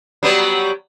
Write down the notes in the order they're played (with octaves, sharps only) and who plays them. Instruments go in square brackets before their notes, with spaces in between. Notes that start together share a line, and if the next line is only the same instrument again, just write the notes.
[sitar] F#3 G3 B3